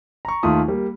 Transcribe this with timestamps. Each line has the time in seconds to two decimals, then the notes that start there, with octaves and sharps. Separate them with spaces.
0.25 A#5 C#6
0.43 D#2 D#3 A3 F4 D#6
0.68 G3 A#3